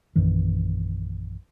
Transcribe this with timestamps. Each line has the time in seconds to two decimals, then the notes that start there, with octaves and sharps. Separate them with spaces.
0.15 A#1 F#2 D#3 E3